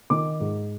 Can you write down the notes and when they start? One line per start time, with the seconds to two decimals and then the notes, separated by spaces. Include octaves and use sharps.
0.10 D#3 D6
0.40 G#2